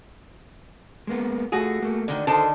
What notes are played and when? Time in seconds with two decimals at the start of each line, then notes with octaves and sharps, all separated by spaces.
1.07 G#3 A#3 B3
1.52 A3 F4 F#4 G#4
1.82 A3 A#3
2.08 D2 D3 D#3
2.27 D3 D#3 A4 C5 A5